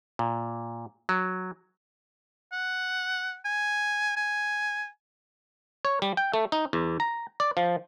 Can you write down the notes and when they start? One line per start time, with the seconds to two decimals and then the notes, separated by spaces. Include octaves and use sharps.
0.19 A#2
1.09 F#3
2.52 F#5
3.45 G#5
4.17 G#5
5.85 C#5
6.02 G3
6.17 G5
6.34 A3
6.52 D#4
6.73 E2
7.00 A#5
7.40 D5
7.57 F3